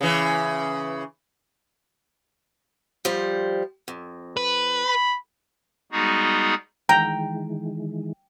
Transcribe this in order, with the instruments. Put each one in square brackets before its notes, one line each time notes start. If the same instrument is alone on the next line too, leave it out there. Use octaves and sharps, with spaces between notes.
[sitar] C#3 E3
[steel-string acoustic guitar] F3 G3 C5
F2
[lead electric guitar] B4
[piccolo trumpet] B5
[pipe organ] G3 G#3 B3 D#4 F#4 G#4
[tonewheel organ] D#3 E3 G#3 [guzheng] G5 [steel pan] A#5